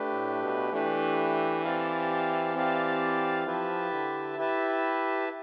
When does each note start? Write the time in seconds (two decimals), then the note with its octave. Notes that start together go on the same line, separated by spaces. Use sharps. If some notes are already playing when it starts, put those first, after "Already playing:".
Already playing: A3 D4 G4 B4
0.12 A2
0.42 B2
0.72 E3 A3 D4 G4 B4
1.64 C4 G4 D5 F5 A5
2.55 C4 G4 D5 F5 A5
3.46 F3 E4 G4 B4 E5 A5
3.92 D3
4.37 E4 G4 B4 E5 A5